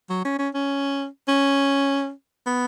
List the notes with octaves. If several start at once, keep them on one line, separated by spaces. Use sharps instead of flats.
F#3
C#4
C#4
C#4
C#4
B3